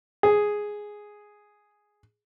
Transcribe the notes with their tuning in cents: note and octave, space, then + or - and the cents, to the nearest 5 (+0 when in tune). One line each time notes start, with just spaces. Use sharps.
G#4 +0